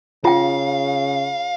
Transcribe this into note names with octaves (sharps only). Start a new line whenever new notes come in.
C#3 F4 F5 G5